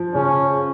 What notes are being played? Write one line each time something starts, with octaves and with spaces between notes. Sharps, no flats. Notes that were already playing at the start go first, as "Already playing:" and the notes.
Already playing: F3
C#3 C#4